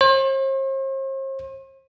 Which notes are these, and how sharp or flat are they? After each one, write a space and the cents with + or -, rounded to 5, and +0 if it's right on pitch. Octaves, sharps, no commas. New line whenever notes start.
C5 +45